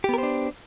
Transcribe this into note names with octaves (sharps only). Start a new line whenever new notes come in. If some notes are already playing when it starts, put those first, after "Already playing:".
B3 D4 G4 A#4 C5